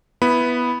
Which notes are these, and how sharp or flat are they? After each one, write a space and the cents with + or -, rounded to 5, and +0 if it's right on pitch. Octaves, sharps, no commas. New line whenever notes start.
B3 +0 E4 +10 B5 +0